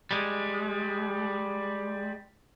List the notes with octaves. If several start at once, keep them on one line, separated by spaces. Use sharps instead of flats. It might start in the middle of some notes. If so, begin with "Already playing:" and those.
G3 G#3